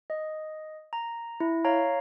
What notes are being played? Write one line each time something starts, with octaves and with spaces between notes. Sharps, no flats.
D#5
A#5
E4
C#5 F5 A#5